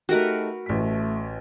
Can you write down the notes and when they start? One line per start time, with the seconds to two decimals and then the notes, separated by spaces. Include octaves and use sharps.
0.09 A3 D#4 F#4 G4 A#4 B4
0.66 A1 A3 B6